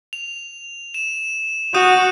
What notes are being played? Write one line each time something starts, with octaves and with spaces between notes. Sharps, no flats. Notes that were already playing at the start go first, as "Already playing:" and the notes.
F7
E7
F#4 D#6 G6 D#7